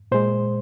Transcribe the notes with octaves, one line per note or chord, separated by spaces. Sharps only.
A#2 G#3 C5